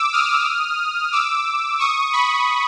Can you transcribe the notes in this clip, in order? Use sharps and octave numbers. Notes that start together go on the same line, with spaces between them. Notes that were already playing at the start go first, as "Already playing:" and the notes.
Already playing: D6 E6
D#6 F6
D6 E6
C#6 D#6
B5 C#6